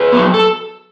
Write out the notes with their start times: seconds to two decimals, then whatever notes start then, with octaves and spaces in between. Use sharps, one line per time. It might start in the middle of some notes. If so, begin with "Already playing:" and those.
Already playing: G#4 B4
0.12 F#3 B3
0.34 A4